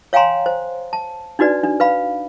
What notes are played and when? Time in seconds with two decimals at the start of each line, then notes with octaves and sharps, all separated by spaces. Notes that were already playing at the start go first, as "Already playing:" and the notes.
0.13 C#5 F5 G5 G#5 A#5 C6
0.46 C5
0.93 A5
1.39 D4 D#4 F#4 B4 D5
1.64 D4
1.80 B4 F5 B5